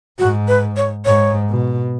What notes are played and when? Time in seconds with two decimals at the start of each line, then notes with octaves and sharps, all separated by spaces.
0.19 G#2 F#4
0.48 B4
0.77 C#5
1.05 G#2 C#5
1.49 B2